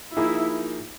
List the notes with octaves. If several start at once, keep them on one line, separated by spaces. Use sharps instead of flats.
F3 A#3 D#4 E4 G#4